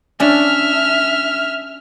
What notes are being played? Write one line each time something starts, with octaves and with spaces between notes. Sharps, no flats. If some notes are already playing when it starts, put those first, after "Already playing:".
C#4 D4 E5 F6